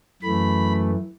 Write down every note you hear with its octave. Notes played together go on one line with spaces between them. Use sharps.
F#2 E3 A3 B5